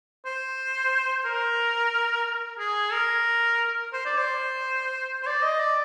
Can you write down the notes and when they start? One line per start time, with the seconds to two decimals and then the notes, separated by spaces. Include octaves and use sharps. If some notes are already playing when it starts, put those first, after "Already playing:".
0.26 C5
1.25 A#4
2.59 G#4
2.92 A#4
3.93 C5
4.05 D5
4.18 C5
5.22 C5
5.27 D5
5.43 D#5
5.60 D5